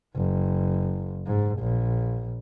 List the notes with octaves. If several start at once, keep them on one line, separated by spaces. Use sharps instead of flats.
F#1
G#2
A#1